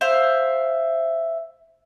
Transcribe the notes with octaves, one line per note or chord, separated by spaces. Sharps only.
C5 E5 F5